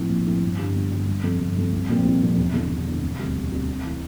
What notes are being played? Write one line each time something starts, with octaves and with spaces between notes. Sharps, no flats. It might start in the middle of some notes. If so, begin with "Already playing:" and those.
Already playing: A2 F3 C4 E4
A#1
A2 F3 C4 E4
G1
G2 D3 G3
G1
G2 D3 G3
G1
F2 C3
G1
F2 C3
C2
A#2 F3 A3 C4
C2
A#2 F3 A3 C4
E1
E2 D3 A3
E1
E2 D3 A3
E1
D2 C3 G3
E1
D2 C3 G3
C3
E3 A3